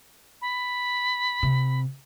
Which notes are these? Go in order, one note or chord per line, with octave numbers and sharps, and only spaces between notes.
B5
C3